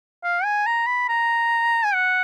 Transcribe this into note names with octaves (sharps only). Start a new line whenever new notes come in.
F5
G#5
A#5
B5
A#5
G#5
F#5